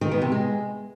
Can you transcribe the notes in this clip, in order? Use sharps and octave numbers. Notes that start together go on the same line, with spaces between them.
D#3
B3
C3
G#3